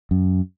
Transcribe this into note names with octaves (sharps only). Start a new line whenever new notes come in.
F#2